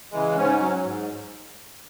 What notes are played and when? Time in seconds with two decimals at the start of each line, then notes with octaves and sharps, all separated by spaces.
0.12 C#3 E3 G#3
0.37 G#2 C#4
0.61 F#3
0.85 G#2